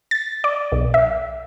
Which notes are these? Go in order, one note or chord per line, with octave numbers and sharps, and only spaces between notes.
A6
D5
B1
E5